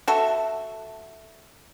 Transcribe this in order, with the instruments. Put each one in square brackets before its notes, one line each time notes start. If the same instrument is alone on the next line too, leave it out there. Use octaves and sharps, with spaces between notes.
[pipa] F#4 A4 E5